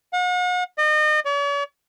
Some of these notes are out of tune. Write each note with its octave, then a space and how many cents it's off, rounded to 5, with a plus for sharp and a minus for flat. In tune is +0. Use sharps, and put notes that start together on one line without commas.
F#5 -40
D#5 -35
C#5 +45